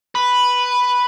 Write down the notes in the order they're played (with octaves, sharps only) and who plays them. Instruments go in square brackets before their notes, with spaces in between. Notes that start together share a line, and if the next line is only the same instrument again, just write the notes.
[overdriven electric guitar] B4